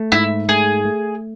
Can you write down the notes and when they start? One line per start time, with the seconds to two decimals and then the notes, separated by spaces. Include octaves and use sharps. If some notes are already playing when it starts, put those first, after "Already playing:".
Already playing: A3
0.12 G#2 E4
0.49 A3 G#4
0.85 A3